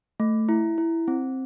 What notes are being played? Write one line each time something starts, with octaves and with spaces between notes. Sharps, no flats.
A3
E4
E4
C4